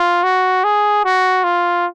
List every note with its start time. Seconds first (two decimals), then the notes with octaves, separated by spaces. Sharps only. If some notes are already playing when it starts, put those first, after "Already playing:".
Already playing: F4
0.24 F#4
0.64 G#4
1.05 F#4
1.44 F4